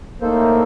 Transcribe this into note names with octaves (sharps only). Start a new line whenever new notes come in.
A2 A3 A#3 D#4 A4 C5